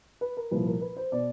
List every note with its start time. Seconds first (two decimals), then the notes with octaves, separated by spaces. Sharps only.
0.21 B4
0.37 A#4
0.51 C2 A#2 F3 B4
0.67 A#4
0.81 B4
0.97 C5
1.12 B2 D5